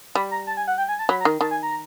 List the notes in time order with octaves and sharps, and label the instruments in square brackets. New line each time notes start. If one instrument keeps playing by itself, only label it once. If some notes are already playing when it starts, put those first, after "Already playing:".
[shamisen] G3 [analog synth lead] B5
[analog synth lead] A#5
A5
G#5
F#5
G5
G#5
A5
[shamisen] F#3 [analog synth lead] B5
[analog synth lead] A#5
[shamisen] D#3
[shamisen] D#3 [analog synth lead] A5
[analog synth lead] G#5
A#5